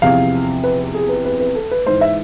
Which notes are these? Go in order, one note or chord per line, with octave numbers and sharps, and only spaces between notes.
E2 C3 F3 F5
B4
G#4
B4
B4
B4
A4
B4
G#2 E3 C5
E5